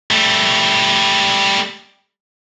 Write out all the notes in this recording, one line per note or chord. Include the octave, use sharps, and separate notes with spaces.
G3 A3